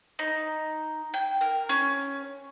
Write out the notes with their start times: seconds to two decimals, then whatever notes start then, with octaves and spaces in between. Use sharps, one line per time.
0.19 D#4
1.14 G5
1.41 A#4
1.69 C#4